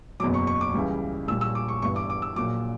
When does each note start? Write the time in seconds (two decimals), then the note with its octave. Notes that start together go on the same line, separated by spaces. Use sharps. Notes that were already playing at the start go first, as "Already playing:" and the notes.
0.20 F#1 E2 B2 F#3 D6
0.34 C#6
0.47 C#6
0.61 D6
0.74 C#2 C#3 E3 G3
1.28 A#1 A#2 G3 E6
1.41 E6
1.55 D6
1.68 C#6
1.82 G1 G2 E3 G3 C#6
1.96 D6
2.10 D6
2.22 E6
2.36 A#1 A#2 F#3 D6